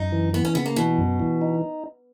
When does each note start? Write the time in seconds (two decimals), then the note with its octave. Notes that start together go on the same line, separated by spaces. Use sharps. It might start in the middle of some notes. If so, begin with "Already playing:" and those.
Already playing: F#2 D#4
0.12 E3
0.33 E3 B3
0.45 C#4
0.55 C#3 B3
0.66 A#3
0.76 B2 E3
0.98 F#2
1.20 E3
1.41 D#4